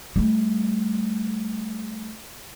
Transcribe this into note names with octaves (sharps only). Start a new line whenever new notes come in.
G3 A3